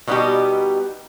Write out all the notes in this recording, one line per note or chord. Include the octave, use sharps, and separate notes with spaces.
B2 G3 B3 D#4 G4